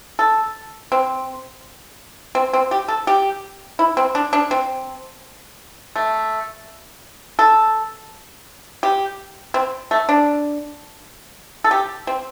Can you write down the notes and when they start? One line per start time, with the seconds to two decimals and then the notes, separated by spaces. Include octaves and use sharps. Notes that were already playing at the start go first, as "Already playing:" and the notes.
0.19 A4
0.92 C4
2.35 C4
2.53 C4
2.71 G4
2.88 A4
3.07 G4
3.79 E4
3.97 C4
4.15 D4
4.33 D4
4.51 C4
5.96 A3
7.39 A4
8.83 G4
9.54 C4
9.91 A3
10.09 D4
11.64 A4
11.71 G4
12.07 C4